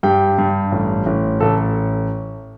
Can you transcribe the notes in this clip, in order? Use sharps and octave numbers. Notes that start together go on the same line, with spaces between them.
G2 G4 G5
G2
A1
A1
A1 A4